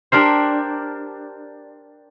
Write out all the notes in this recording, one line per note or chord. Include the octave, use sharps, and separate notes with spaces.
D4 G4 A#4 C5